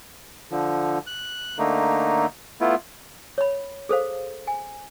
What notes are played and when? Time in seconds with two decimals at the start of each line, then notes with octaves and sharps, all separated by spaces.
0.51 D3 F3
1.07 F#6
1.58 D3 A3 A#3 D#4
2.61 A3 B3 E4 F4
3.38 C#5 B5
3.89 G#4 A4 C5 F5
4.47 G#5